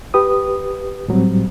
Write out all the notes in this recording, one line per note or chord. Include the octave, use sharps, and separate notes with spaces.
G4 B4 D#6
A2 F#3 G3 C4